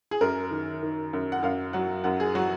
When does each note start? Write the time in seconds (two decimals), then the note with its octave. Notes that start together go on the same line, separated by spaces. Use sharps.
0.11 G#4
0.21 F#2 A#4
0.51 D#3
0.83 D#3
1.13 F#2
1.32 F#5
1.43 F#2 F5
1.73 F#3 F#5
2.04 F#2 F#5
2.20 G#4
2.35 F#3 F#4